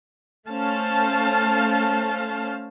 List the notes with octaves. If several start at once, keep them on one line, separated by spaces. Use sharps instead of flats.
A3 C#4 C5 F5 A5